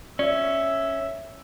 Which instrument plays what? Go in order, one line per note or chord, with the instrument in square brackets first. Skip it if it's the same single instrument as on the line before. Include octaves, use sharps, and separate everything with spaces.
[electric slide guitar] C#4 [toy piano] D5 [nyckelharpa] E5